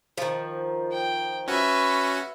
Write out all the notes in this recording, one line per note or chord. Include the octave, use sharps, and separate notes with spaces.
D#3 F3
G5
C#4 F#4 B4 E5